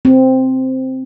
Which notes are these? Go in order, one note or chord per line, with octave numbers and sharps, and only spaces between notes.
C4